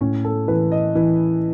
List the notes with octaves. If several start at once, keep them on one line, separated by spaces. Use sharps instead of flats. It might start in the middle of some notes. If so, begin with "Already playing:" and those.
A2 C#4
A4
E3 B4
D#5
E3